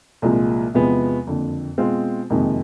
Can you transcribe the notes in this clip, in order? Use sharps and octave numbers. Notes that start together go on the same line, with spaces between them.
C2 A#2 F3 G#3
E2 C3 F3 G#3 B3
F#1 F2 D3
B2 G#3 C4 F4 G#4
F#1 F2 C3 D#3 G#3